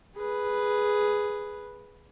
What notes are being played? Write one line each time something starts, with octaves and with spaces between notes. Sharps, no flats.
G#4 B4